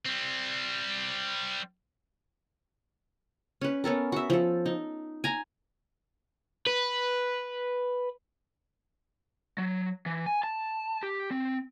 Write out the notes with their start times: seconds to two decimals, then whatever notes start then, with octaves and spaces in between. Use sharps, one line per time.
0.06 G3 C4
3.61 C#4 B4
3.84 B3 C#4 A4 A#4
4.12 F#4 E5
4.30 F3 A4
4.66 D#4
5.24 G#5 A#5
6.66 B4
9.58 F#3
10.06 E3
10.26 G#5
10.43 A5
11.03 G4
11.31 C4